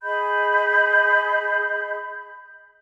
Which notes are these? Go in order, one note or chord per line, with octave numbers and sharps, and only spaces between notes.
G#4 D#5 B5 G6